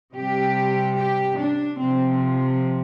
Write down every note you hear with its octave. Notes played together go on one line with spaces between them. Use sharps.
C3 G3 G4
G4
D4
C3 F3 C4